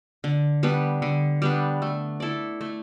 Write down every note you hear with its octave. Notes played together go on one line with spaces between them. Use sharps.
D3
G3 B3 D4
D3
G3 B3 D4
A3
E4 A4 D5
A3